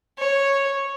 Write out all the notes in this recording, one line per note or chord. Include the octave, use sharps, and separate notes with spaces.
C#5